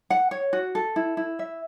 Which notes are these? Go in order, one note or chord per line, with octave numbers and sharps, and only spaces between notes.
F#5
C#5
F#4
A4
E4
E4
E5